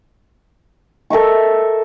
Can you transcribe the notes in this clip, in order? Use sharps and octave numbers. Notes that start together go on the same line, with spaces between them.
A4 A#4 E5 C#6